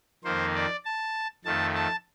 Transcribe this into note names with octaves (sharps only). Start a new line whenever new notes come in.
F2 D#3 A#3 C5
D5
A5
F2 D#3 A3 A5
A5